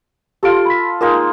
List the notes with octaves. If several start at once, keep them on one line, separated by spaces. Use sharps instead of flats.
F4 G4 A4 C6 D7
B5 B6
G#3 A#3 D#4 F4 A#4